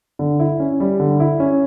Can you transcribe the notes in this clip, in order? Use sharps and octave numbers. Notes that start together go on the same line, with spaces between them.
D3
E4
C#4
G3
D3
E4
C#4